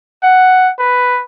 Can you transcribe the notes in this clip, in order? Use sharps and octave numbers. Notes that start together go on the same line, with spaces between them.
F#5
B4